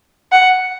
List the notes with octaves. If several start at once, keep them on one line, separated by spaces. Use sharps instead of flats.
F#5